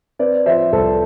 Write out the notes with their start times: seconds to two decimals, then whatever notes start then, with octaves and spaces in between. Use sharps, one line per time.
0.19 C4 B4 D5
0.46 F3 C5 E5
0.73 C2 A4 C5